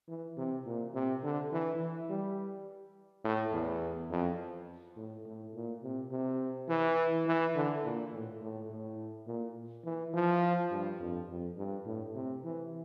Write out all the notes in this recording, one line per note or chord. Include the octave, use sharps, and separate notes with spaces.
E3
C3
A#2
C3
D3
E3
E3
G3
A2
E2
F2
A2
A2
A#2
C3
C3
E3
E3
D3
A#2
A2
A2
A2
A#2
E3
F3
G2
F2
F2
G2
A2
C3
E3